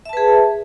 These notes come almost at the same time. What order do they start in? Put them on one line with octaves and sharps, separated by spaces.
E5 A5 B4 G#4